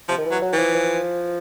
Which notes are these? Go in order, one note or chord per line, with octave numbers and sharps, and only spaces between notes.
C3 F3
D#3
E3
F#3
F#3
E3
F3
F3